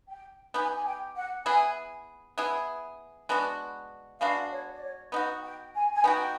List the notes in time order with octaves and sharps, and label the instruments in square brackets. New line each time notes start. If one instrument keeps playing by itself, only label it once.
[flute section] G5
[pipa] B3 D#4 G4 [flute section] G#5
[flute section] G#5
G5
F#5
[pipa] B3 E4 G#4 [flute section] G#5
[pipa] B3 E4 G#4
G#3 B3 D4 F#4
[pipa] G#3 B3 D4 F#4 [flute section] F5
[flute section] C#5
D5
C#5
[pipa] B3 D#4 F#4 [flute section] F#5
[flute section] G5
G#5
G#5
[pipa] B3 D#4 F#4 [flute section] G5